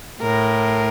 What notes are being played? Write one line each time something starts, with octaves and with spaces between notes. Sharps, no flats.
A2 A#4